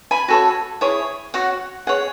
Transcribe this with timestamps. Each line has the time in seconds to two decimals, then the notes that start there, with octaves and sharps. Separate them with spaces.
0.11 G#5 B5
0.28 F#4 A4 C#5
0.81 E4 G#4 C#5
1.34 F#4 C#5 F#5
1.87 G#4 C#5 F#5